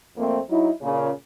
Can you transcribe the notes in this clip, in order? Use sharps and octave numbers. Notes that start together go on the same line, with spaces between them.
F2 A3 A#3 C4
F#3 D#4 E4
A#2 C#3